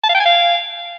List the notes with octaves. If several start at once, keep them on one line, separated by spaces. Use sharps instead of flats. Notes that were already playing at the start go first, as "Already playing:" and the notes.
A5
F5
G5
G#5
F5